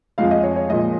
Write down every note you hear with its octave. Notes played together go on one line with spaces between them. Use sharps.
F2 F3 G#3 F5
D#5
C#5
C#5
A#2 F3 G#3 D#5